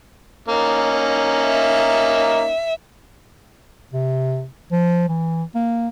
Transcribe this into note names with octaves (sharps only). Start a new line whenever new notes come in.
A#3 C#4 D#4
E5
C3
F3
E3
A#3